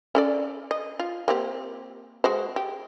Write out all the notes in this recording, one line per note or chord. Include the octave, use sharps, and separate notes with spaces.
C#4 A4 D5
D#5
F4
A#3 C4 G4
G#3 F#4 C5
G4